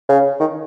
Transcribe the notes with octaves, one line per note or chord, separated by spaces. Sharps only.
C#3
D#3